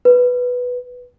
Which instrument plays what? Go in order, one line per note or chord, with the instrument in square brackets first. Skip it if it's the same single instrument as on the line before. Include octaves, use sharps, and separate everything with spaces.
[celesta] B4